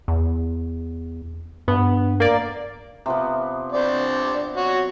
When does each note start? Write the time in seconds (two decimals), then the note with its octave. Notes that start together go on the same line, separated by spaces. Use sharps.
0.08 E2
1.68 G2 B3
2.20 A#3 D5
3.06 C3 F3 B3
3.72 C4 D4 D5
4.57 F#4 C#5